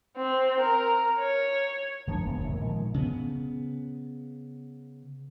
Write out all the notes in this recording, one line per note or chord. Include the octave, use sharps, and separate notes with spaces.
C4
A#4
C#5
G1 F3 A#3 D4
F#1 C#3 A#3 B3
F1 B1
A#2 D3 A3
A#2 D#3 F3 G#3
C#3 B3